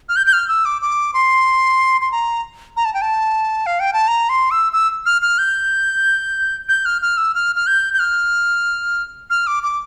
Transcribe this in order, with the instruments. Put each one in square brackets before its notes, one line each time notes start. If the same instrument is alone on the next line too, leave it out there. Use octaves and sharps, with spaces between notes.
[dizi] F6
G6
G6
F6
E6
D6
D6
C6
C6
A#5
A#5
A5
G5
A5
F5
G5
A5
A#5
C6
E6
E6
F6
F6
G6
G6
F6
F6
E6
F6
F6
G6
G6
F6
F6
D6
D6